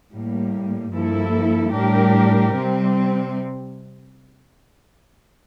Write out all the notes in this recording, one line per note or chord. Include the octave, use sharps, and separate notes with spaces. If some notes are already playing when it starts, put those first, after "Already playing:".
A2 G3 A#3
G2 F3 A#3 E4 A4
A2 G3 D4 G4 A#4
C3 G3 C4